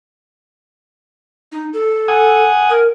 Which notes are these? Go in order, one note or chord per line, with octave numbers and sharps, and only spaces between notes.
D#4
A4
F#5 G#5 D#6
A#4